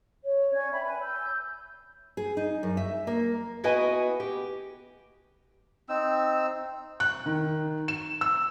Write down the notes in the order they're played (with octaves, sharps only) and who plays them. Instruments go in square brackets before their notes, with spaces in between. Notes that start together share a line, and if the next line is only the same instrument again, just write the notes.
[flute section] C#5
C#4 D5 G#6
C#5 E5 G5 B5
B4 G#5 B5
E6 G6
[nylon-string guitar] G#4
D#4
F#2
E5
A#3
B3 E4 F#4 B4 D#5 G#5
G4
[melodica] C4 D#4 E6
[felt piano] F#6
D#3
E7
E6